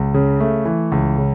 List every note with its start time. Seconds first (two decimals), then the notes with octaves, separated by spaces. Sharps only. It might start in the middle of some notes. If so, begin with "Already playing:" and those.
Already playing: C#2
0.14 C#3
0.40 A3
0.65 E3
0.92 C#2
1.18 C#3